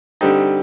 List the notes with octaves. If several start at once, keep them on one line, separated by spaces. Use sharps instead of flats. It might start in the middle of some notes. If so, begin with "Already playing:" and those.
D3 G3 C4 D#4 G4